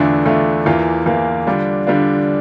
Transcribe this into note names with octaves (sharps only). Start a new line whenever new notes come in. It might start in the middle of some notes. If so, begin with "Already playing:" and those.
Already playing: E2 D3 A3 D4 F4
E2 D3 A3 D4 F4
E2 E3 A#3 F4
E2 E3 A#3 F4
D3 G3 D4 F4
D3 G3 D4 F4